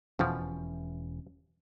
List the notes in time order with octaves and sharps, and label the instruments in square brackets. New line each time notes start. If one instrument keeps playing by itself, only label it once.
[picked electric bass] E1 E3 C#4 [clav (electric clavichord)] F2 B2 F3